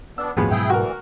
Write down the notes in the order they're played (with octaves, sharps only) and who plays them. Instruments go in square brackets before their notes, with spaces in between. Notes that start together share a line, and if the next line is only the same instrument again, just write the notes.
[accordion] B3 D4 [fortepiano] E6
[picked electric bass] G#1 F2 A2 [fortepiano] F3 G#3 B3 [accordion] F#3
[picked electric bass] G#2 B2 F#3 [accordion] E4 G#4 G5
[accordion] D2 E3 [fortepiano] F#4 A#4